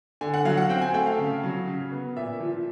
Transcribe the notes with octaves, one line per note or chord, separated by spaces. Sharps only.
D3 G#5
F#5
F#3 F5
F#5
C4 G5
G#5
A3 G5
F5
C#3
F#3
C#3
B3
A#2 E5
F3